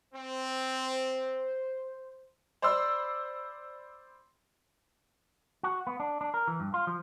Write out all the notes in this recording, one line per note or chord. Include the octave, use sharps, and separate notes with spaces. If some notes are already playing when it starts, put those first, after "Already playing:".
C4 C5
C5 D5 B5 C6 E6
F#4
B3
D4
D4
A#4
E3
G2
F4
F3